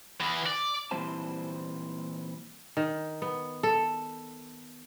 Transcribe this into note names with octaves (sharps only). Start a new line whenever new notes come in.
E3 B3
D5
A#2 E3 G3 C4 C5 A5
D#3
B3
A4